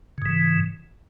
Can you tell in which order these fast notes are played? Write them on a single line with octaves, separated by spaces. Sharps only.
C#3 G#2 E3